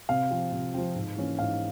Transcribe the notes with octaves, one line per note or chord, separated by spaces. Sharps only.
C3 F5
F3 C4
C3
F3 C4
G#2
E3 A#3 C#4
G#2 F5